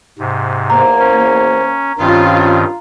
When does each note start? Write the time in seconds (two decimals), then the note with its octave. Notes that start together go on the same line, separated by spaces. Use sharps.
0.19 G#2 C3
0.70 E2 A#3 C5 A#5
0.99 C#4
1.99 G2 D#3 G3 C4 C#4 F4